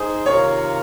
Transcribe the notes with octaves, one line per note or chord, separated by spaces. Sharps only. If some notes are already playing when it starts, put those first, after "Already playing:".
Already playing: D#4 G#4 C5
C3 D#3 A#3 F4 A#4 C#5